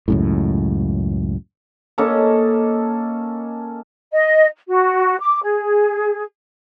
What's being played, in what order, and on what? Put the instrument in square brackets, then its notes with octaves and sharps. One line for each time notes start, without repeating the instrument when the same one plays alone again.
[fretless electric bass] C#2 F#2 A2
[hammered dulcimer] A#3 C#4 D#4 A4
[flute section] D#5
F#4
D6
G#4